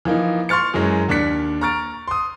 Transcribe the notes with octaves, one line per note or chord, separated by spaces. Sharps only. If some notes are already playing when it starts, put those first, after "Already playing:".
E3 F3 A#3 D#4
C6 C#6 F6 A6 C#7
F#2 E3 F#3 G#3
D#2 D4 D5 F#6 B6 C#7
A#5 C#6 F6 A6 D7
C6 D#6